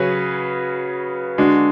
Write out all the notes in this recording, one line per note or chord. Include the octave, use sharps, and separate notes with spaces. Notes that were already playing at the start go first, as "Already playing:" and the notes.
Already playing: C#3 F#3 C#4 G#4 B4
D3 G#3 D4 F#4